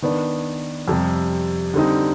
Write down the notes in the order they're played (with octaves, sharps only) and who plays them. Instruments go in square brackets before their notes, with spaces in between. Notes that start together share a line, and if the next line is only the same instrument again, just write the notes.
[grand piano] D#3 B3 D4
F2 C3 G3
D3 G3 C4 D#4